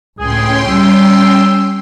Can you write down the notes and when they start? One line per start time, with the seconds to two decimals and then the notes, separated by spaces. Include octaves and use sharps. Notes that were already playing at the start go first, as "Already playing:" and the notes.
0.18 C#2 A2 C#4 G#4 G5 C6
0.70 G3 E6